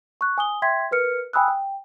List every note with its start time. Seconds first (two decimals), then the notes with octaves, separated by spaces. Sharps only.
0.21 C#6 F#6
0.38 G#5 D#6 G7
0.62 E5 G5 C6 G#6 B6
0.91 A#4 B4 F6 C#7
1.33 G5 G#5 B5 D#6 E6 F#6
1.48 G5